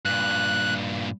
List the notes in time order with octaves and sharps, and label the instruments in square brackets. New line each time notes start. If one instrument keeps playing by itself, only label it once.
[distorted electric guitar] G2 A#2 [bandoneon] F#6